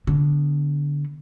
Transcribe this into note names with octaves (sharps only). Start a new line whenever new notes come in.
D3 B3